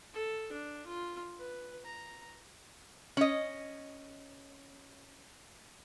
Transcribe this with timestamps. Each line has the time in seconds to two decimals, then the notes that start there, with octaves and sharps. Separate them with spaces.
0.13 A4
0.52 D4
0.86 F4
1.39 B4
1.85 A#5
3.17 C#4 D#5